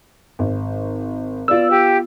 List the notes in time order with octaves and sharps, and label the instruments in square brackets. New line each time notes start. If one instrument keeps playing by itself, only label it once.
[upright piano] G#1
[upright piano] B3 F4 [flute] D5 [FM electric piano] E6
[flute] G4